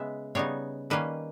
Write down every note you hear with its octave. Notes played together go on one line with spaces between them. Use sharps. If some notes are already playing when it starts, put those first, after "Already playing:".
Already playing: C#3 G#3 B3 E5
C#3 G3 B3 D#4 C#5
D#3 G3 A#3 C#4 B4